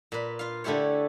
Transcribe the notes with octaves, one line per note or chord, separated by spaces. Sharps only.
A#2 B4
F4 F5
D3 A3 E4 G4 C#5